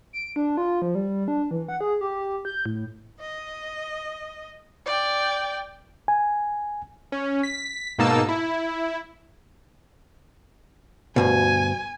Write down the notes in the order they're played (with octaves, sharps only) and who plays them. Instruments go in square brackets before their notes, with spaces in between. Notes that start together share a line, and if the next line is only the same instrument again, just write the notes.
[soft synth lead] D7
D4
F4
F3
G3
D4
E3
F#5
G#4
G4
G6
A2
[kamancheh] D#5
D5 G5
[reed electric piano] G#5
[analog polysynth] C#4
B6
G#2 B2 A#3 D#4 A5 E6
E4
[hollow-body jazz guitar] D2 G2 B2 [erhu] G#5